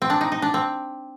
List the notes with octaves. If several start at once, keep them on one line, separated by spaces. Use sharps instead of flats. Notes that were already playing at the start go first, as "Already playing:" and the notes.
C4
D4
D#4
D#4
D4
C4